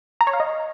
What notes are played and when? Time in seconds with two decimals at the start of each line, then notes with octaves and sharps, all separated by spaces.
0.21 A#5
0.27 C#5
0.33 F5
0.40 D#5